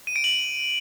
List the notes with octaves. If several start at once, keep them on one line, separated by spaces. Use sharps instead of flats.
D#7
D7
F#7